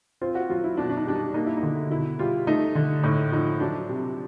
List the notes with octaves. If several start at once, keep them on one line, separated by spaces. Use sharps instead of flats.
C4 F4
F#4
F#3 F4
E4
B2 D4
D4
D#4
G3 D4
D#4
A#3 D#4
E4
D#4
D3
B2 E4
G3 F4
A3 D#4
D3
A2 D#4
F3 D#4
F#3 D4
C3